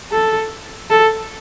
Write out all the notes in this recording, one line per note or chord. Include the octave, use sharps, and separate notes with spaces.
A4
A4